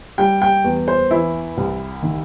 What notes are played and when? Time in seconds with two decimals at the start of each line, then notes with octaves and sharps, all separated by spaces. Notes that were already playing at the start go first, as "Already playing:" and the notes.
0.18 G3 G5
0.42 G5
0.64 E2
0.88 C5
1.11 E3 E4
1.57 C2
2.03 D#3